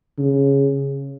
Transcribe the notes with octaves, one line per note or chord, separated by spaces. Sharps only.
C#3